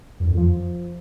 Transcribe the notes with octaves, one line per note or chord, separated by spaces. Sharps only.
F#2
E2
F2
F3